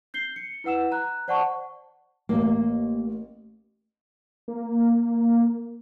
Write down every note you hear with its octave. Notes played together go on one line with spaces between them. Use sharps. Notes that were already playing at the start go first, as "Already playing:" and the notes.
G6 C7 G7
C#7
E4 B4 F#5 E6 E7
A#5 F#6
C5 D5 F#5 A5 C#6
A1 A#3
A#3